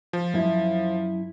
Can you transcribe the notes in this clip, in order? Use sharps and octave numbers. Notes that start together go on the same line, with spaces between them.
F3
F#2 E4